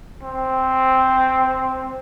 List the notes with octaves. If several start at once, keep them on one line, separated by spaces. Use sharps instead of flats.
C4